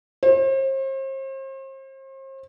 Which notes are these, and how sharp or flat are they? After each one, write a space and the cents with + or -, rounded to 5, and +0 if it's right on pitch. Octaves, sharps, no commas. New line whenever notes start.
C5 +40